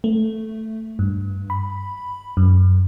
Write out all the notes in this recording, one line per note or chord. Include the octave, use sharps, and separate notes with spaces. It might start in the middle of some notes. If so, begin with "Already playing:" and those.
A3
G2
B5
F#2